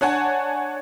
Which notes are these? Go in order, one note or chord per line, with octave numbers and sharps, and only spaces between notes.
D4 C#5 F#5 G#5 A5